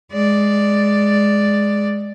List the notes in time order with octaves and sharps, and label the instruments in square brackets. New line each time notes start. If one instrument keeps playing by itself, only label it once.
[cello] G#3 D5